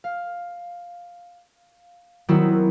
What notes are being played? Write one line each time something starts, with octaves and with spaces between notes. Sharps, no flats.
F5
D#3 F#3 B3 C4 E4 F#4